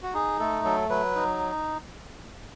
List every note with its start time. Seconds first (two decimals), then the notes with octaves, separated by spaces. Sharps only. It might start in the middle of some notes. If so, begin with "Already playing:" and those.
0.03 F#4
0.14 D#4 G#4
0.39 A3 A4
0.64 F#3 A4
0.89 F#3 B4
1.15 D#4